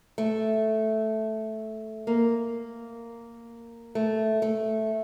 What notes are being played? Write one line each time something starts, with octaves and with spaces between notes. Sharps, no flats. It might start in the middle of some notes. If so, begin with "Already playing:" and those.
A3
A#3
A3
A3